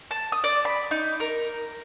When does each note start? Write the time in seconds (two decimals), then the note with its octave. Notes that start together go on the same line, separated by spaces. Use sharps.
0.11 A5
0.32 D#6
0.44 D5
0.65 B5
0.91 D#4
1.20 A#4